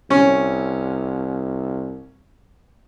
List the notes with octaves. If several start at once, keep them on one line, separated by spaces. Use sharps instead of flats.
C2 C#4